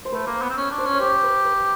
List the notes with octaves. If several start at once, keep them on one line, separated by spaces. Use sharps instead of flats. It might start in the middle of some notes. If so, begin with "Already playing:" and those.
C5
A3 B4
A#3 C5
B3
C4
C#4
D4
C5
C#4
C#5
G4 C5
B4
B4